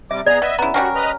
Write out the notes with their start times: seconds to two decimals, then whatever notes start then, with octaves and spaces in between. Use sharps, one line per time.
0.11 C3 G3 E5 D6
0.26 B3 G#4 D5 A#5
0.42 B3 D#5 E5
0.58 C#3 B3 E4 A#5
0.74 G3 C#4 F#4 A#4 F#5
0.95 B4 D#5 A#5